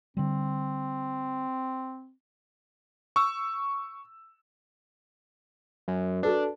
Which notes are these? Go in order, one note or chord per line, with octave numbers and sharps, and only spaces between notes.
D3 G3 C4
C#6 E6
F#2
D4 F#4 A4 B4